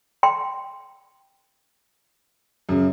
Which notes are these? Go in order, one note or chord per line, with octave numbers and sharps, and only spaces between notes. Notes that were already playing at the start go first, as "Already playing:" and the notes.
G5 C6
F#2 C#3